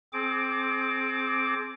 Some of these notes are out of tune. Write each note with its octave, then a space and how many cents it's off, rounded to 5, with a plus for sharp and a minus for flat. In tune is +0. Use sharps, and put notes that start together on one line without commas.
C4 +10 G#4 +40 D6 +0